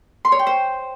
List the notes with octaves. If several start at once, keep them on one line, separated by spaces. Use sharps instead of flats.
C6
C#5
G5
C5